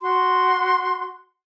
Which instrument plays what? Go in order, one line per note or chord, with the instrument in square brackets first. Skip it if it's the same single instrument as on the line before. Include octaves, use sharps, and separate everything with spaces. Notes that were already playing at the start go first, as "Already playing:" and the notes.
[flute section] F#4 C6